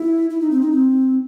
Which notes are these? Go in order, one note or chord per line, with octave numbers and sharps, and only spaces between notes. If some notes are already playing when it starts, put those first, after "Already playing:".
Already playing: E4
E4
D#4
C4
D#4
C4